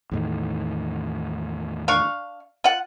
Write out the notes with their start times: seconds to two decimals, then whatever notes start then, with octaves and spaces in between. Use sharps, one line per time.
0.11 E2 A2 D#3
1.88 D4 F5 C#6
2.64 F4 F#5